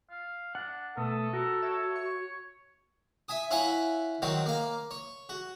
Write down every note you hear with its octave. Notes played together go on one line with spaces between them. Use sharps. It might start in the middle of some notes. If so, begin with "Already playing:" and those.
F5
D4 F#5
B2 A3 A4 D#6
F#4 A#4
C#5 E5
C#6
E5 G#5 D#6
E4 C#5 F5 F#5 G#5 B5
D#3 F#3 C4 F#4
A#3 F5
C#5
F#4